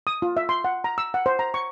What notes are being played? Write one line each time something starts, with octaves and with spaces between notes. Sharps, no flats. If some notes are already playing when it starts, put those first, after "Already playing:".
D#6
F4
E5
C6
F#5
A#5
E6
F#5
C5
A#5
C#6